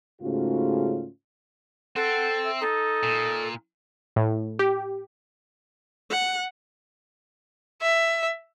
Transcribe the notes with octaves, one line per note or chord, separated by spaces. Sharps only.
G#2 C#3 A3 C#4 F4 F#4
C4 A4 F#5
E5
D#4 A4
A#2
A2
G4
F#5
E5